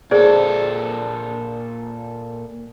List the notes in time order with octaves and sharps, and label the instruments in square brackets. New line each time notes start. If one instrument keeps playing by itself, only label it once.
[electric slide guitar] A#2 A4 [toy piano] G#4 C5 D5